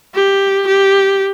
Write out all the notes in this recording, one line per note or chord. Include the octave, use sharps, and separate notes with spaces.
G4
G4